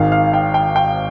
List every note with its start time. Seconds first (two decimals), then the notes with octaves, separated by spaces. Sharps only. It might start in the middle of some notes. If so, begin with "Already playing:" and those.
Already playing: G#1 G#2 D#3 F5
0.12 F5
0.33 G5
0.54 G5
0.76 G5